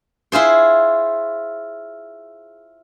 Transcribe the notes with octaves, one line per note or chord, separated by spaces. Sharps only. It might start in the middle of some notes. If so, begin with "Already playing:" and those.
E4 F4 G#4 C5